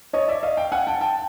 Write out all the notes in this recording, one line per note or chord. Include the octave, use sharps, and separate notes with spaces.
C#5 D#5
D5 E5
D#5 F5
F5 G5
F#5 G#5
G5 A5
G5 A5